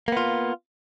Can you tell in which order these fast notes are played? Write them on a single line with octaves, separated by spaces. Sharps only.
A#3 B3 F4